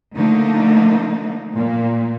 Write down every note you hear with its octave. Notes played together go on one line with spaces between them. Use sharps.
D3 F3 A3 A#3 D#4
A#2